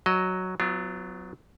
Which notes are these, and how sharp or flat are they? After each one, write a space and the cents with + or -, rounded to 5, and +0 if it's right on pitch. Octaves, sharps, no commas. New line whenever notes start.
F#3 +0 D#5 +0
F#3 +0 B3 +35 F4 -30